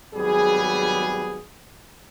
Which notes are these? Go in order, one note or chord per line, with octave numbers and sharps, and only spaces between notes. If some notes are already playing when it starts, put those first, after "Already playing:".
G#1 F#3 G3 B3 G#4